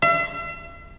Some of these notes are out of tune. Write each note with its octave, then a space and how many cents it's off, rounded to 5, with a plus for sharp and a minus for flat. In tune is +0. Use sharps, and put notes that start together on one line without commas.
E5 +45